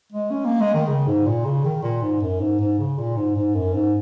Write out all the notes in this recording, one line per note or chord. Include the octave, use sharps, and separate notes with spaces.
G#3
C#4
A#3
G#3
D#3
C#3
G#2
A#2
C#3
D#3
A#2
G#2
F#2
G#2
G#2
C#3
A#2
G#2
G#2
F#2
G#2